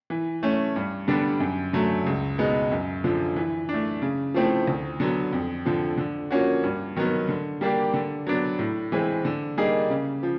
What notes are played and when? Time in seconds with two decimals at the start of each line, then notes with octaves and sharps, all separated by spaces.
0.10 E3
0.43 A3 C#4
0.76 G2
1.08 D3 G3 B3 D4
1.40 F#2
1.73 D3 F#3 A3
2.06 C#2
2.38 B2 G#3 B3 D#4
2.71 F#2
3.04 D3 F3
3.36 E3
3.69 A3 D4
4.02 C#3
4.34 F3 A3 C4 E4
4.67 D2
5.00 D3 F#3 B3
5.33 F2
5.66 D3 F3
5.98 D3
6.31 F3 A#3 C#4 F#4
6.63 G2
6.96 D#3 F#3 B3
7.29 D3
7.61 G3 A#3 D4 G4
7.94 D3
8.27 F#3 B3 D4
8.59 A2
8.92 E3 G#3 C4
9.25 D3
9.58 G3 A#3 D#4 G#4
9.90 C#3
10.23 F3